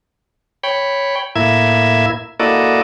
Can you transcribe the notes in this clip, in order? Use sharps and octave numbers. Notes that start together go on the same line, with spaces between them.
C#5 G5 B5
A2 A#3 E4 E5 G#6
A#3 E4 F#4 A4 D5 D#5